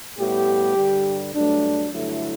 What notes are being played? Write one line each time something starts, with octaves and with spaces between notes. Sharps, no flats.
A2 G3 B3 G4
G2 D3 G3
G2 F#3 A3 D4
G2 D3 F#3 A3 E4